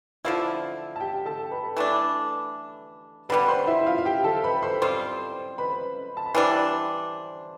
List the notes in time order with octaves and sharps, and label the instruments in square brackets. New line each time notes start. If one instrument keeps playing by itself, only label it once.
[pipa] D3 F3 A3 E4 [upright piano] F4 F5
[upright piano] A5
G4 G5
A4 A5
B4 B5
[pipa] E3 A3 D4
[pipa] D3 G3 B3 [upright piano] B4 B5
[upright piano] C5 C6
E4 E5
F4 F5
F5
G4 G5
A4 A5
B4 B5
C5 C6
[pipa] G3 C4 F4 [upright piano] C5 C6
[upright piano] B4 B5
A5
B5
[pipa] E3 G3 D4 [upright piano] C5 C6